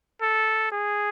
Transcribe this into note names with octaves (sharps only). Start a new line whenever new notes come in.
A4
G#4